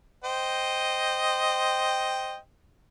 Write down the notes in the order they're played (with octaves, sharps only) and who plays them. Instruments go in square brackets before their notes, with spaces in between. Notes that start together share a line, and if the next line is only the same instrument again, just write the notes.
[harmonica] C5 D#5 G5